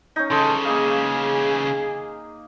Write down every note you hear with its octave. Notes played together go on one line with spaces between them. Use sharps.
C#4 D#4
C#3 E3 A4 D#5 C6
A#3 G#4 D#5 F5